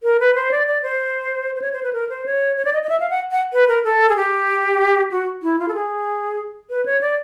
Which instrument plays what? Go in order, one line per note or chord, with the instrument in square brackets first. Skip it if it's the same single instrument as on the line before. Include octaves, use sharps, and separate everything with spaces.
[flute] A#4
B4
C5
D5
D5
C5
C5
C#5
C5
B4
A#4
C5
C#5
C#5
D5
D#5
D#5
E5
F5
F#5
F#5
B4
A#4
A4
G#4
G4
F#4
E4
F4
A4
G#4
B4
C#5
D5